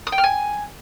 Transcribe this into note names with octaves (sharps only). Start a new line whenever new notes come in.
D#6
G5
F6
G#5